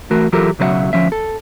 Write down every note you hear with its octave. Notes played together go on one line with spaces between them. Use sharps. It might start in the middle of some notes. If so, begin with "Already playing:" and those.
E3 A3 F#4 A#4
E3 F#3 F4 G4 A4 A#4
B1 C#3 F#3 B4 E5 F#5
D2 B2 F3 C#4 E5
A4